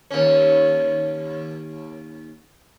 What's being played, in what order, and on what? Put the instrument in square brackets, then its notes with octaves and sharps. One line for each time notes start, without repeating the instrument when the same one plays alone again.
[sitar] D#2 C#4